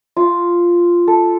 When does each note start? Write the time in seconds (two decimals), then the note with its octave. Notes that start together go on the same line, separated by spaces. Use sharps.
0.16 F4
1.07 A4